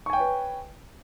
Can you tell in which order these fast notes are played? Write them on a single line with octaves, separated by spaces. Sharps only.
C#6 G#5 G5 C#5 B4